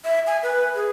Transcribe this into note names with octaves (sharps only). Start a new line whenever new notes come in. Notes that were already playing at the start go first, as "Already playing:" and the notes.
E5
G#5
B4
G#4